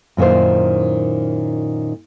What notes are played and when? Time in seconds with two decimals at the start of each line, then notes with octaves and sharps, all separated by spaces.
0.17 F#2 A#2 D#3 E4 C5